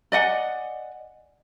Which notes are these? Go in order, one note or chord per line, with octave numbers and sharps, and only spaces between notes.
D5 D#5 F#5 G#5